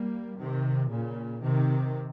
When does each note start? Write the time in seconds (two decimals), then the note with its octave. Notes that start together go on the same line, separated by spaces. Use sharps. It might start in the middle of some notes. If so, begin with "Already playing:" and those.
Already playing: G3 A#3
0.38 C3 D#3
0.90 A#2 C#3
1.42 C3 D#3